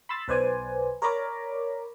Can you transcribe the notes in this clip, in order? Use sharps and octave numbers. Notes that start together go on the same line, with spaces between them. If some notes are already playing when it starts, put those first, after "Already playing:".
B5 C6 E6 A6
B1 B4 C5 D5 G#5
A#4 C#5 D5 A#5 B5 D6